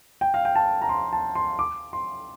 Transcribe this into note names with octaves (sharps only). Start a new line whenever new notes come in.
G5
F5
G5
A5
A#5
C6
A5
C6
D6
C6